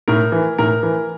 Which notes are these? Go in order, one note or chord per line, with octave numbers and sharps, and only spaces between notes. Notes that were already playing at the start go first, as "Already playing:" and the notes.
A2 A#4
E3
A2 A#4
E3